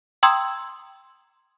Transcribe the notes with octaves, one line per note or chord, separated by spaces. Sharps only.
G5 A#5 C6 D#6 E6 G#6